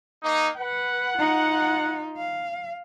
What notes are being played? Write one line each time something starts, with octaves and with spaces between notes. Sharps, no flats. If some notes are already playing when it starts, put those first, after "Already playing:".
A#3 D#4
B4 F#5
D#4 F4
F5